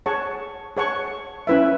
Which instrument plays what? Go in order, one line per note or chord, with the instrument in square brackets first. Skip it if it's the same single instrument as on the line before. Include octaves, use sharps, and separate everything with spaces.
[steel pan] G#4 C#5 F#5 A5 C#6
G#4 C#5 F#5 A5 C#6
C#4 E4 B4 E5